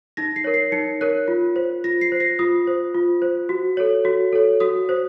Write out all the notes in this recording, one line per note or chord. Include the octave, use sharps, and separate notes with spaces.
D#4 A#6
C7
A#4 C#5
C7
D#4 C#7
A#4 C#5 F#6
F4
C5
F4 A#6
C7
C5
A#6
F4 D#6
C5
F4
C5
F#4
A4 C#5
F#4
A4 C#5
F#4 D#6
C5